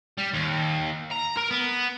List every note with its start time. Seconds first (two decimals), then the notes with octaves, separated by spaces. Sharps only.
0.18 G3
0.34 D#2
1.11 A#5
1.37 A#4
1.50 B3